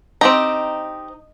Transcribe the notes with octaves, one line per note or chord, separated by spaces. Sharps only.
C4 D#4 G4 A#5